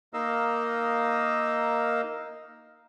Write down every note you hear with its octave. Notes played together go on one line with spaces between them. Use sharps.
A#3 D#4 A#4 D#5 F5 E6